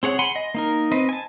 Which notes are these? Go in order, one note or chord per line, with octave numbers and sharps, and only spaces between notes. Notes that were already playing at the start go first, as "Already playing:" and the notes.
C4 G#4 C#5 F#5
F#5 G#5 B5 C6
D#5
A#3 D#4 A#4
C4 B4 D#5
G#5 A5